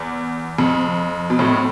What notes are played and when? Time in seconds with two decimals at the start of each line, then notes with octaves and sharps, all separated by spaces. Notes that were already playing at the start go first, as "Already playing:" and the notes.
Already playing: E2
0.59 F2
1.30 B2
1.39 F2 A2